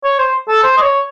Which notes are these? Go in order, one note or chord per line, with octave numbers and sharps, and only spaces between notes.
C#5
C5
A4
C5
D#5
C#5